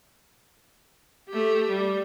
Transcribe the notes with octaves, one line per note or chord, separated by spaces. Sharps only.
A3 G4
G3